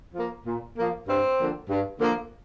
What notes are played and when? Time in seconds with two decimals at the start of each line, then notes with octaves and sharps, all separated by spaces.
0.15 F3 A#3
0.45 A#2
0.76 F3 A#3
1.07 G2 C4
1.38 D3 F3 A#3
1.68 G2
2.00 D3 F3 A#3